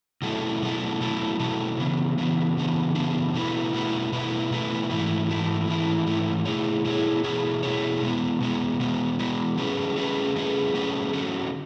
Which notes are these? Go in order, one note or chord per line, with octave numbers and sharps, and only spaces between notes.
B2 F#3 A3 E4 A4
B2 F#3 A3 E4 A4
B2 F#3 A3 E4 A4
B2 F#3 A3 E4 A4
C#3 E3 B3 D4
C#3 E3 B3 D4
C#3 E3 B3 D4
C#3 E3 B3 D4
B2 A3 E4 B4
B2 A3 E4 B4
B2 A3 E4 B4
B2 A3 E4 B4
G#2 E3 A3 E4
G#2 E3 A3 E4
G#2 E3 A3 E4
G#2 E3 A3 E4
B2 A3 E4 G#4 C#5
B2 A3 E4 G#4 C#5
B2 A3 E4 G#4 C#5
B2 A3 E4 G#4 C#5
B2 G#3 B3
B2 G#3 B3
B2 G#3 B3
B2 G#3 B3
F#3 A3 C#4 G#4 B4
F#3 A3 C#4 G#4 B4
F#3 A3 C#4 G#4 B4
F#3 A3 C#4 G#4 B4
D3 F#3 A3 C#4 F#4